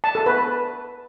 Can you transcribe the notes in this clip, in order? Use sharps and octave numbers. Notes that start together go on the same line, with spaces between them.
A5
A4
B4